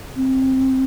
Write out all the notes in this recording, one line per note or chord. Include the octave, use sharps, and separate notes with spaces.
C4